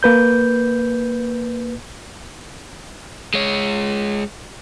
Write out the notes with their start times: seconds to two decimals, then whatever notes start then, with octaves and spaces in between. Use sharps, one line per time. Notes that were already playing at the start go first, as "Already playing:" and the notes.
0.03 A#3 B4 G6
3.34 G#3 C#5